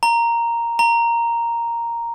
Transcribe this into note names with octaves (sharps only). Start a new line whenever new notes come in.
A#5
A#5